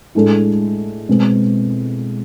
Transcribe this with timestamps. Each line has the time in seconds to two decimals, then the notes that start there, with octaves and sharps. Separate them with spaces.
0.15 A2 G#3 D4 A4
1.09 B2 G#3 C4